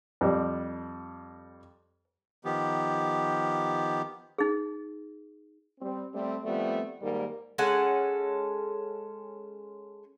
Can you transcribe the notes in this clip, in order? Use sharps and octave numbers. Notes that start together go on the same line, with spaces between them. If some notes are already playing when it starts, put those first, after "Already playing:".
F2 G3
D#3 F3 B3 G4
D#4 G#4
G3 C4
G3 A3 C4
F3 G3 A3 B3 C4
D#2 G#2 G3 A#3 A#4
G#3 C#4 A4 F#5